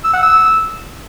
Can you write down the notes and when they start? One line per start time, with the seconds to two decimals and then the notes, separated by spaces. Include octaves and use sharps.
0.04 E6
0.13 F#5
0.23 E6